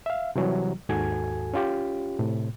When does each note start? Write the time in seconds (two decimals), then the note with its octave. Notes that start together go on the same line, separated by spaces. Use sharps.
0.06 E5 F5
0.36 C3 E3 F#3 G3
0.89 D#2 G#2 F#4 A4 G#5 G#6
1.54 C#4 F4 G4
2.19 A2 C3